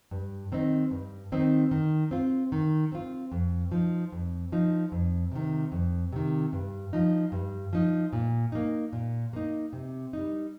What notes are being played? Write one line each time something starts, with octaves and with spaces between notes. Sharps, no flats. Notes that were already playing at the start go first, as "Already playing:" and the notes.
G2
D#3 C4 D#4
G2
D#3 C4 D#4
D#3
C4 F4
D#3
C4 F4
F2
F3 D#4
F2
F3 D#4
F2
C3 D#3
F2
C3 D#3
G2
F3 D#4
G2
F3 D#4
A#2
A#3 D#4
A#2
A#3 D#4
C3
G3 D#4